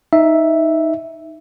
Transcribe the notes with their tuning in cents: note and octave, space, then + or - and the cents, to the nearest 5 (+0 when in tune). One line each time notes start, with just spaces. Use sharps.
D#4 +10 E5 +0